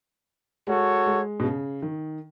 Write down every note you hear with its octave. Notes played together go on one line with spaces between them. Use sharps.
G#3 F#4 A4 C#5
G#3
B2
C#3
D#3